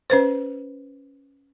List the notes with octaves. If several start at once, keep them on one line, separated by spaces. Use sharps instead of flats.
C#4 B4 C5